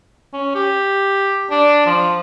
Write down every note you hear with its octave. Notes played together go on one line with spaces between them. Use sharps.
C#4
G4
D4
F3